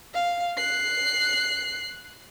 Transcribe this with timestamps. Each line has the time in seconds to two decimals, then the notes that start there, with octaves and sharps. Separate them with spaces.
0.14 F5
0.57 F#6 C7